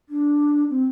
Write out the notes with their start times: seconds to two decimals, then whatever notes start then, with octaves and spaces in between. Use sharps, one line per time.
0.09 D4
0.70 C4